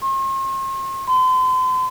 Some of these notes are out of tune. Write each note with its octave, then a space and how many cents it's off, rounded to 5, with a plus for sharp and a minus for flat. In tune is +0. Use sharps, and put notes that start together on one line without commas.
C6 +45
C6 -40